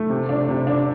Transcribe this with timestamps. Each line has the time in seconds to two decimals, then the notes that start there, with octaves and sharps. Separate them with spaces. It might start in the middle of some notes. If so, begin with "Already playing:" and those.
Already playing: A3
0.10 C3
0.29 D4
0.49 C3
0.67 D4